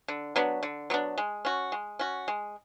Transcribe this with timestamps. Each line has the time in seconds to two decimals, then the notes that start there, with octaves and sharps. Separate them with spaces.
0.08 D3
0.36 F#3 B3 D4
0.63 D3
0.90 F#3 B3 D4
1.18 G#3
1.45 C#4 F#4
1.72 G#3
1.99 C#4 F#4
2.28 G#3